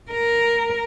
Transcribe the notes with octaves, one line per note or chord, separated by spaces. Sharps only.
A#4